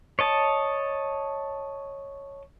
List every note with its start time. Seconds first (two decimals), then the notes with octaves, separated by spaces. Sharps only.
0.19 C#5 D#5 A5